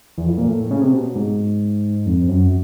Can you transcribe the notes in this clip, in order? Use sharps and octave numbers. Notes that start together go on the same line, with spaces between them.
E2
F2
A#2
A2
C#3
C3
B2
G#2
F2
F#2